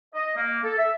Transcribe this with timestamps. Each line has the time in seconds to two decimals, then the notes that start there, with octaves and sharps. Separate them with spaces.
0.15 D#5
0.36 A#3
0.63 A4
0.78 E5